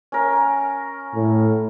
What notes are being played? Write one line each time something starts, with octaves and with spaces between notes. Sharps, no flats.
C#4 A#4
A2